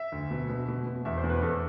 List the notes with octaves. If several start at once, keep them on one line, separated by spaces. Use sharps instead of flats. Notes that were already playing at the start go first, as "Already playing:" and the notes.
Already playing: E5
D2
B2
B2
B2
B2
E2 E5
C5
E2
B4
E2 A4